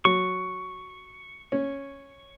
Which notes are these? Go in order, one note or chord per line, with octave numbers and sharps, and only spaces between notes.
F#3 C#6
C#4